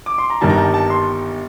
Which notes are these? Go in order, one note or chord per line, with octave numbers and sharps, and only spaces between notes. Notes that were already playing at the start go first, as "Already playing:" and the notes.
D6
C6
A#5
G1 G2 D#3 G3 A#3 A5
A#5
A5
A5
C6